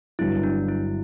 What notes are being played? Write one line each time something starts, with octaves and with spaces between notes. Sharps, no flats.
G1 G2 F#3 E4
D4
E4